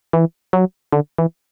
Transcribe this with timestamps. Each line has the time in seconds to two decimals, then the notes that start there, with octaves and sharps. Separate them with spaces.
0.13 E3
0.53 F#3
0.93 D3
1.18 E3